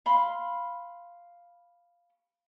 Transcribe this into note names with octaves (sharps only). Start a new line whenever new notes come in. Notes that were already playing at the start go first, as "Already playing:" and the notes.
F5 B5 C6